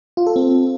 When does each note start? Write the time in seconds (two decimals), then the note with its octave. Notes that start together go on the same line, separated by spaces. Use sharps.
0.17 F4
0.26 A4
0.36 C4